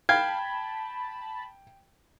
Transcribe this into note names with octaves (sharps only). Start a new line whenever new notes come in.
F5 G5 A5 B5 G#6